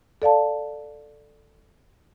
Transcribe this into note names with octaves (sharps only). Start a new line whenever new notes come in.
A4 D5 F5 A5